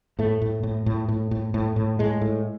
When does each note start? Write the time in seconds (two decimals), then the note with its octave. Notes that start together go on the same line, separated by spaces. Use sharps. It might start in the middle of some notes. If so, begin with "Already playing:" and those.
0.19 A2 A3
0.42 A2
0.63 A2
0.86 A2
1.09 A2
1.31 A2
1.54 A2
1.76 A2
1.99 A2 G#3
2.21 A2